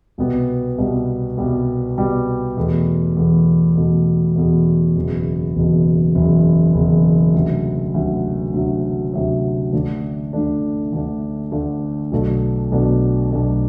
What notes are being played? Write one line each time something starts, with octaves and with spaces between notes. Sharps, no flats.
C2 B2 G3 B3
C2 B2 G3 B3
C2 B2 G3 B3
C2 B2 G3 B3
E2 B2 A3
E2 B2 A3
E2 B2 A3
E2 B2 A3
F#1 E2 B2
F#1 E2 B2
F#1 E2 B2
F#1 E2 B2
D2 C3 F#3
D2 C3 F#3
D2 C3 F#3
D2 C3 F#3
D2 D3 A3 D4
D2 D3 A3 D4
D2 D3 A3 D4
D2 D3 A3 D4
B1 B2 A3 D4
B1 B2 A3 D4
B1 B2 A3 D4